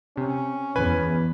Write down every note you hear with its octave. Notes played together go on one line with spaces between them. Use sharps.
C3 C#4
E2 B4 G#5